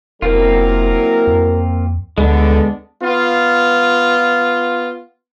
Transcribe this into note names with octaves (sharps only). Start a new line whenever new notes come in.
F1 F#3 A#3 C4 E4 F4 A#4
F2
D2 D3 G#3 B3 D4
B3 F4